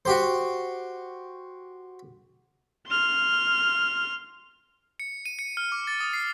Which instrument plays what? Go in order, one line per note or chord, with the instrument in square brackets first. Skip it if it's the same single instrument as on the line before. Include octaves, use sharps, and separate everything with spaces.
[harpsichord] F#4 G4 C5
[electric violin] C6 F6
[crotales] C#7
D#7
C#7
F6
D6
A6
D#6
C7